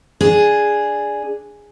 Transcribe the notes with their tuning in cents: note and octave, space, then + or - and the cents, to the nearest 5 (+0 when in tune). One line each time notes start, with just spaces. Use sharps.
D4 +0 G#4 +0